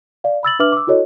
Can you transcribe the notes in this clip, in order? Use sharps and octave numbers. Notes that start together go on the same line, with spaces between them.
D5 F5
B5 E6 A6 F#7
D4 B4 E5 D6 F6 F#7
D6 E6
E4 F#4 A4 C#5 D#5